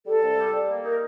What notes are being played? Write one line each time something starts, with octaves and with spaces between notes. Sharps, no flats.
G3 A4
C2
G3
G3
A#3
D#4 A#4